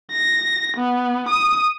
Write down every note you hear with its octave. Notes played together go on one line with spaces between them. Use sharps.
A#6
B3
D#6